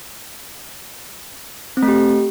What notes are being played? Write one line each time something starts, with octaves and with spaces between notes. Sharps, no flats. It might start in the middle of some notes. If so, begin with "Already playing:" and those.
C4
A3
G4